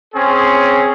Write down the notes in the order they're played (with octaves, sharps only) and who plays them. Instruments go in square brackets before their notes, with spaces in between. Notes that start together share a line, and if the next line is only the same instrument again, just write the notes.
[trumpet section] C4 C#4 G#4